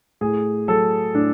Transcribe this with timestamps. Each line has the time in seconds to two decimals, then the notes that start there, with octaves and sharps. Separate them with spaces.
0.21 A2 G#4
0.68 F#3 A4
1.14 A2 D4